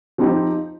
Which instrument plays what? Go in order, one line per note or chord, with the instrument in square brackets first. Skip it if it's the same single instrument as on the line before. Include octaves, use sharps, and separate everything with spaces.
[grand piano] F3 C4 D#4 G4